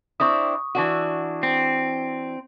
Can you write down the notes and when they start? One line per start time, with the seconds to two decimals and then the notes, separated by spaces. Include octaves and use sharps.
0.20 C4 D4 E4 C#6 D#6
0.75 E3 D4 F#4
1.43 C4